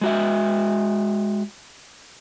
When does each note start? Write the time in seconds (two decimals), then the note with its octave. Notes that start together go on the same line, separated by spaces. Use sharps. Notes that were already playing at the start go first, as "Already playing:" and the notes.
0.01 G#3 F#4 E5